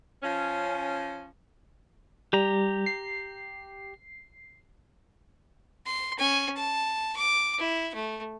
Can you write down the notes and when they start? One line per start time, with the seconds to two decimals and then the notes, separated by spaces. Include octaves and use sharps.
0.22 F3 C#4
2.33 G3 G4 A#5
2.86 C7
5.86 C6
6.18 C#4 G#5
6.56 A5
7.16 D6
7.58 E4
7.95 A3